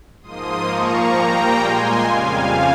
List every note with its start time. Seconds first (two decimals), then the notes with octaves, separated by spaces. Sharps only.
0.22 G#2 F3 A#3 C6 D#6
0.66 A#2 F3 A#3 A#5 C#6
1.12 A#2 G3 A#3 G5 A#5
1.57 A#2 G#3 G#5 C6
2.03 F2 C#3 G3 F5 G#5